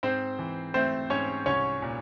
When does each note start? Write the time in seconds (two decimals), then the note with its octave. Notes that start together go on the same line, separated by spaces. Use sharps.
0.03 G#2 C4 C5
0.39 E3
0.74 A3 C4 C5
1.10 G#2 C#4 C#5
1.46 C2 C#4 C#5
1.82 A#2